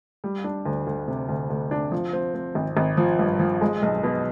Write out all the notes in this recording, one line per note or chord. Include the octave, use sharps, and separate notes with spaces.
G3
D4
D2
D2
C3
D2
D2
D4
F3
C4
C4
G#1
G#1
F3
G2
F3
G#3
B1
B2